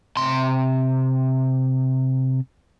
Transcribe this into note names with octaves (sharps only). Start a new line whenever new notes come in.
C3 C6